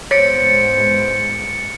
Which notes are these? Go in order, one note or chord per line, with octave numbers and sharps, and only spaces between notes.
G#2 G#3 B3 C5 C#5 A6 C#7 D7